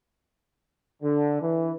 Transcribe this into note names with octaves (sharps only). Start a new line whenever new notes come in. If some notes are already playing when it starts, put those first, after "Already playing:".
D3
E3